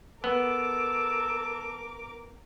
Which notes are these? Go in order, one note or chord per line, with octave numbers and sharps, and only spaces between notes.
B3 A4 A#4 D6